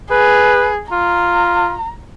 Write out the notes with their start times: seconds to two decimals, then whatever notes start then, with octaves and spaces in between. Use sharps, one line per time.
0.11 G#4 B4
0.92 F4 A#5